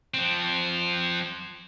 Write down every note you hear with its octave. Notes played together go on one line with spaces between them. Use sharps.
F3 C4